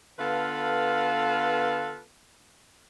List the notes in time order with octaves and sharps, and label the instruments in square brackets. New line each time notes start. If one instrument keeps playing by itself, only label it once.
[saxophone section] D3 B3 F4 A4 B4 F5